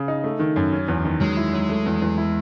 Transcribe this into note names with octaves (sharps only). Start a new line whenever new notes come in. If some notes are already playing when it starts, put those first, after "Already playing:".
Already playing: C#3
D#4
A3
D#3
F#2
C#4
E2
D#3
F#3 G#3
E4
F#3
A3
E2
E2
E4